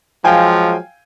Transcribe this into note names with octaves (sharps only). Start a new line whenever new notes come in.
F3 F#3 G#3 F5 G5 G#5